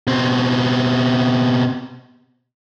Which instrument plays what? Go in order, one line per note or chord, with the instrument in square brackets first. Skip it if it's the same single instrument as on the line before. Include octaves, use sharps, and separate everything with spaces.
[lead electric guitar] B2 C4